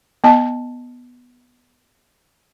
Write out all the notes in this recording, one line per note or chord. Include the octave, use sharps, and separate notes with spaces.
B3 D#5 A5